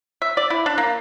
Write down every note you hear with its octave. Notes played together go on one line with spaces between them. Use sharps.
E5
D5
E4
D4
A#3